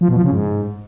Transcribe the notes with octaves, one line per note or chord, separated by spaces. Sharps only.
F3
B2
F3
C#3
G#2